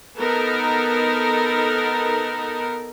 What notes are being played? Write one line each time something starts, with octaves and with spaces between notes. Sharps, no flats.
B3 D#4 A4 A#4